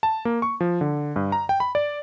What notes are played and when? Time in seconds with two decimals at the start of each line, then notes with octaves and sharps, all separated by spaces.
0.03 A5
0.25 A#3
0.42 C#6
0.61 F3
0.81 D3
1.16 G2
1.32 A#5
1.49 G5
1.60 B5
1.75 D5